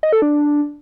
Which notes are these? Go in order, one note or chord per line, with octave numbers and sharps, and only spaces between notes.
D#5
A4
D4